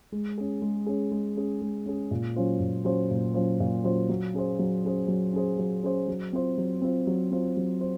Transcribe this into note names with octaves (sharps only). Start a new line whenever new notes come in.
G#3
C#4 G#4
G#3
C#4 G#4
G#3
C#4 G#4
G#3
C#4 G#4
A#2
F#3 C#4 F4 C5
A#2
F#3 C#4 F4 C5
A#2
F#3 C#4 F4 C5
A#2
F#3 C#4 F4 C5
F#3
C#4 G#4 C5
F#3
C#4 G#4 C5
F#3
C#4 G#4 C5
F#3
C#4 G#4 C5
F#3
C4 F4 C5
F#3
C4 F4 C5
F#3
C4 F4 C5
F#3
C5